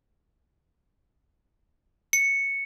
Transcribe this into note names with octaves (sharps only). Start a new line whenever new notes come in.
C#7